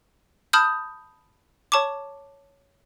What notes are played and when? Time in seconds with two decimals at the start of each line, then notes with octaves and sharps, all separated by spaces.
0.53 A5 B5 D#6 F6 G6
1.72 C#5 A5 C#6 D6